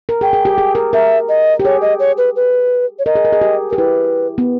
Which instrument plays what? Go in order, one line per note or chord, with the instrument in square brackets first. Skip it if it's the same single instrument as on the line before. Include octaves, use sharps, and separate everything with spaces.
[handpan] A#4
[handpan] G#4 [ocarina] G5
[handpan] G#4
G4
G#4
A#4
[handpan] A#4 [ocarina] E5
[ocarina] D#5
[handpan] G4
[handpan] G#4 [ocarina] C#5
[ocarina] D#5
C#5
B4
B4
C#5
[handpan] A#4 [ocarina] D#5
[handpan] G#4
A#4
G#4
G4
[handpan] G4 [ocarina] A#4
[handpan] E4 [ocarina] B4
[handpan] B3